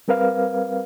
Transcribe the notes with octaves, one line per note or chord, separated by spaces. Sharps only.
G3 C4 A#4 B4 F5